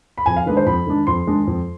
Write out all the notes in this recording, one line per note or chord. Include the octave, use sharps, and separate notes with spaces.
B5
F2 G#5
F5
D#3 G#3 D4 B4
C5
F2 B5
D#3 G#3 D4
F2 C6
D#3 G#3 D4
F2